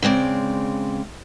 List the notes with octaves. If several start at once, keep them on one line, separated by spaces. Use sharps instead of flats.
C#3 G#3 C4 D5